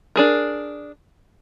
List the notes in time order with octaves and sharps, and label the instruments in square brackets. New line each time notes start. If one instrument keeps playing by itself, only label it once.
[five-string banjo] D4 G#4 A#4